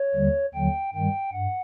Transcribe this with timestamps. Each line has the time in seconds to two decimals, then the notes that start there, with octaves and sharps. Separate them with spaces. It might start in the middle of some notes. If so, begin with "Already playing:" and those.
Already playing: C#5
0.15 D#2 D3 G3
0.54 D#2 D3 F#3 G5
0.94 G2 D#3 G3 G5
1.33 G2 F#5